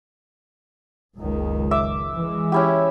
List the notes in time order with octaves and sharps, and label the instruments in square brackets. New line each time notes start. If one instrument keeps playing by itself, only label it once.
[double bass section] F#1 C#2 D#3
[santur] E5 D6
[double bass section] E3 G#3
[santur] C#4 E4 G4